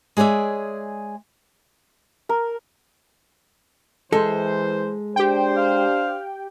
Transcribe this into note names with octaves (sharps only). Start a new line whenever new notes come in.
G#3 G#4 C#5 D5 E5
A#4
E3 G#3 A4 C5
D4 G4 C5 G5
F5